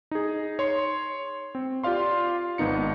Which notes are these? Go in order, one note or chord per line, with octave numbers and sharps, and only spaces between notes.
D#4 G#4
C#5 C6
C4
F4 G4 D5 F5 C6
G#1 B3 D#4 C#7